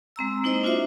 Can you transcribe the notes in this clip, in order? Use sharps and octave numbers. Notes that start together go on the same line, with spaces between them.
G#3 C4 A#5 E6
A#3 D#4 E4 C5 D#5
D4 F4 F#4 C5 E5